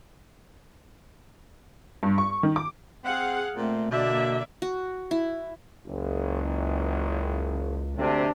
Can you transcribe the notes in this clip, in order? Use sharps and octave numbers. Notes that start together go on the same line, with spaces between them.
G2
C#6
D#3
D6
C4 G#4 F5 F#5
A#2 A3 C4
B2 D3 A#3 D5 E5
F#4
E4
F#1 C#2
D2 C3 D4